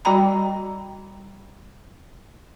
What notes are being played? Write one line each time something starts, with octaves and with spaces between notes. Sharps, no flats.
G3 F#4 D5 G5 A#5 B5